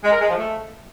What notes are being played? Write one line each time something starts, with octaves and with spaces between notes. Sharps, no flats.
G#3
A#4
G#3
F3
A3